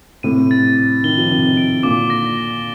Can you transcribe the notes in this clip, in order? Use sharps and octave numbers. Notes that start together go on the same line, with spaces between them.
A2 C3 D#7
A6
A6
D#3 G7
F3
C3 D#3 G7
D7
A#2 D3 D6
A#6
A#6